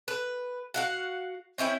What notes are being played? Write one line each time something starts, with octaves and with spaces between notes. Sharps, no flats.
B4
F#4 F5 F#5
C4 C#4 E4 G5